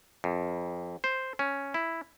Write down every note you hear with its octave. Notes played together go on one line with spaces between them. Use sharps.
F2
C5
C#4
E4